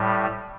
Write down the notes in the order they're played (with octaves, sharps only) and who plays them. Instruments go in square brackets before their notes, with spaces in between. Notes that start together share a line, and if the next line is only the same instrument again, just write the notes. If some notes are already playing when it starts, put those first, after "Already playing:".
Already playing: [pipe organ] A2 G3